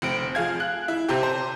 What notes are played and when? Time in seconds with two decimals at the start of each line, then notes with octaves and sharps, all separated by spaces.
0.02 F1 C4 D7
0.35 F3 G#4 F5 G#6
0.60 F#6
0.88 E4
1.09 C3 C4 G4
1.23 C5